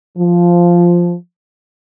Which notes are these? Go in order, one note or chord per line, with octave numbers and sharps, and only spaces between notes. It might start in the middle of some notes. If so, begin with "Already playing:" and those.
F3